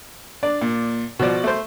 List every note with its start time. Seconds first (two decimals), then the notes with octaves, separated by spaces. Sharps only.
0.43 D4 D5
0.61 A#2
1.19 B2 F3 F#4 D5
1.44 A3 C5